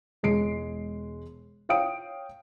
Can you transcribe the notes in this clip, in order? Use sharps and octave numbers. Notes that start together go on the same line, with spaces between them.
E1 G#3 C7 D7
C#5 F5 G5 D#6 D7